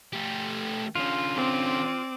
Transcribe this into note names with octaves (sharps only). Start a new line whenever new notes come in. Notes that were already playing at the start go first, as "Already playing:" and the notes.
A3 G4
D3 C#4 F4
C4 D5